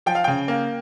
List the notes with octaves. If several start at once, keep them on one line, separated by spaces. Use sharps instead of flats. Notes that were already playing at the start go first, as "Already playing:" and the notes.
F3 G5
F5
C#3 G5
A#3